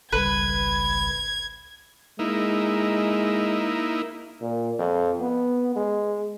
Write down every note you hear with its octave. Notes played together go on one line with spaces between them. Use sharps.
G#1 C#2 G3 B4 G#6
G#3 A#3 D#4 E4
A#2
F2
B3
G#3